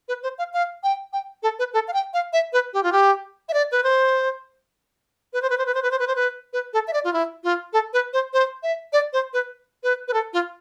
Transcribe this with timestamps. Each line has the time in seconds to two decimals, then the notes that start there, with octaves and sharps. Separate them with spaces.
0.08 B4
0.23 C5
0.38 F5
0.53 F5
0.84 G5
1.13 G5
1.43 A4
1.59 B4
1.74 A4
1.88 F5
1.93 G5
2.14 F5
2.33 E5
2.53 B4
2.74 G4
2.83 F4
2.92 G4
3.49 E5
3.54 D5
3.72 B4
3.84 C5
5.33 B4
5.42 C5
5.50 B4
5.58 C5
5.66 B4
5.75 C5
5.83 B4
5.91 C5
5.99 B4
6.08 C5
6.16 B4
6.53 B4
6.73 A4
6.88 E5
6.93 D5
7.04 F4
7.13 E4
7.44 F4
7.73 A4
7.93 B4
8.13 C5
8.33 C5
8.63 E5
8.93 D5
9.13 C5
9.33 B4
9.84 B4
10.08 B4
10.14 A4
10.33 F4